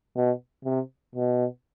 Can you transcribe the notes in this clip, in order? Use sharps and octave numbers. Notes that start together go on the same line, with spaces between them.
B2
C3
B2